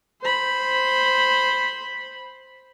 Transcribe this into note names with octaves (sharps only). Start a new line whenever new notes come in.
C5 B5